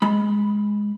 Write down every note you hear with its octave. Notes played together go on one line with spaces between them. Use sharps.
G#3 B5